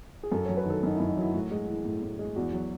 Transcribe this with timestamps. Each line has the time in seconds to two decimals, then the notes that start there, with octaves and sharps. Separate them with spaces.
0.23 G#4
0.32 F#2 A4
0.45 F#3 C#5
0.57 B4
0.66 D#3 A4
0.83 F#2 D#4
0.96 F#2 E4
1.09 D#4
1.17 F#3 E4
1.34 A2 F#4
1.51 G#3
1.68 E3
1.85 A2
2.02 A2
2.19 G#3
2.36 E2 F#4
2.53 F#3 F#4